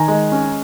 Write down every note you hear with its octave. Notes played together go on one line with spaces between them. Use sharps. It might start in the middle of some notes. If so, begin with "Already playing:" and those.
Already playing: D#3 G#5 A#5
G#3
C#4